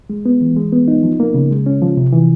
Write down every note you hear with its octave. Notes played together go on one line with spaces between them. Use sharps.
G#3
B3
E3
G#3
B3
D#4
F3
A#3
C#3
G#3
C#4
F3
C3
E3